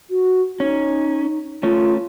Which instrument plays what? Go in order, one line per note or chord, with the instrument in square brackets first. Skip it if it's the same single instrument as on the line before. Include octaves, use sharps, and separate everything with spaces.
[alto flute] F#4
[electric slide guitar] C#4 [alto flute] D#4
[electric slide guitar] A3 C#4 [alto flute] F4